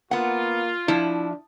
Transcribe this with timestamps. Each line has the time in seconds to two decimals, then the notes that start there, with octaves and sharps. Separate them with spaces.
0.11 A#3 B3 F4 F#5
0.88 F3 D4 E4